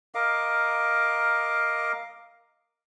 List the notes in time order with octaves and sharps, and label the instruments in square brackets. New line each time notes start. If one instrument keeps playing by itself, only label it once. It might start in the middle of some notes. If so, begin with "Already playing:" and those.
[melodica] A#4 D#5 F5 D6